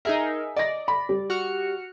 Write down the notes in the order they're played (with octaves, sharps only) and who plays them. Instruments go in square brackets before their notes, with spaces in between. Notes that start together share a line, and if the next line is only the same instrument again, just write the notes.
[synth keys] D#4 G#4 A#4 [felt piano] E5
[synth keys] D5 [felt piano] D#5 A#6
[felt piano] B5
G3
[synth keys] F#4 F6 C#7